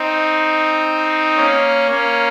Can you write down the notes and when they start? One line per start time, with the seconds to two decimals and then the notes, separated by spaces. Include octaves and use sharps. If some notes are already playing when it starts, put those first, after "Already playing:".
Already playing: C4 D#4
1.37 A#3 C#4
1.91 A#3 C#4